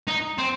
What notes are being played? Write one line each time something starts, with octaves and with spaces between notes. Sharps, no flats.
D#4
C4